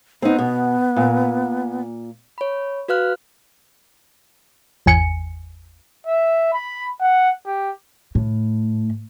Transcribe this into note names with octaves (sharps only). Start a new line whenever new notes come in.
B3 C4 D#4
B2
A#2
C#5 B5
F#4 B4 F5 F6 F#6
G#1 E2 G#5 C#7
E5
B5
F#5
G4
A2